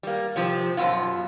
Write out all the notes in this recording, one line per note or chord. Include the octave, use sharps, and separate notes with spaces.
G3 A#3
C3 F3 C4
F#2 B2 F4